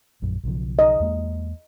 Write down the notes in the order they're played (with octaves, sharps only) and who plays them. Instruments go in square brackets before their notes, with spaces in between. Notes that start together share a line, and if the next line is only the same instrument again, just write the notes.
[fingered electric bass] A#1 F#2
B1 C#3 F3
[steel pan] D#5
[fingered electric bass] E2 G#3 A#3